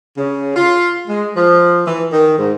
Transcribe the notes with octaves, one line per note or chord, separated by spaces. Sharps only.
C#3
F4
G#3
F3
E3
D#3
G#2